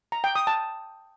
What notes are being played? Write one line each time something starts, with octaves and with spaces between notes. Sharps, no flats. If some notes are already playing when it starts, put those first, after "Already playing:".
A#5
G5
D#6
A5